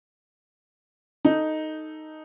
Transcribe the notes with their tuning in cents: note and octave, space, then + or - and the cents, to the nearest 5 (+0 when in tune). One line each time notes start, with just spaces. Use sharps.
D#4 +0 A4 +0